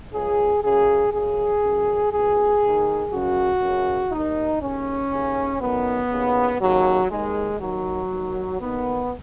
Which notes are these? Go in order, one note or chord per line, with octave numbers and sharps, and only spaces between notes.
C#2 C#3 G#4
F#2 C#3 G#4
F#2 C#3 G#4
F#2 C#3
C#2 B2 G#4
D#2 D#3
F#2 C#3 F#4
F#2 C#3
D#2 D#3 D#4
D#2 C#3 C#4
D#2 C#3
F#2 D#3 B3
D#2 C#3
D#2 C#3 F#3
D#2 D#3 G#3
D#2 D#3 F#3
D#2 D#3
D#2 D#3 B3